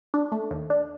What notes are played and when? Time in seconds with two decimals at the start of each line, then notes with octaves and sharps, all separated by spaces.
0.14 D4
0.32 A3
0.51 D#2
0.70 D4